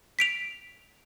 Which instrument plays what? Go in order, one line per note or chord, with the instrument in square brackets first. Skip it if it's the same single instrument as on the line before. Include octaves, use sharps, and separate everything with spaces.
[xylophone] B6 D7 F7